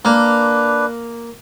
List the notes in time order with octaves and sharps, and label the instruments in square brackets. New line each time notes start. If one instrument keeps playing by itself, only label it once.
[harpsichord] A#3 [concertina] D4 B4